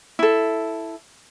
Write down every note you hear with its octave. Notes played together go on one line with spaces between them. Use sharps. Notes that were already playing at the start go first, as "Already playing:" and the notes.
E4 A4